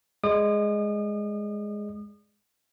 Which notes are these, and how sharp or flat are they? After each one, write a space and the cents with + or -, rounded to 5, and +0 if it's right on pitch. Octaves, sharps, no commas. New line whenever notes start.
G#3 +0 D5 +0 D#6 -40